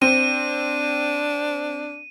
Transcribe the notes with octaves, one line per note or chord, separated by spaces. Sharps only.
C4 D4 D#7